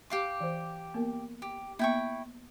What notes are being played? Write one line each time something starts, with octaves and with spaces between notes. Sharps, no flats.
G4 F5 D6
E3 C5
A#3 B3 A#4
G4
A#3 B3 E4 E5 G5 C#6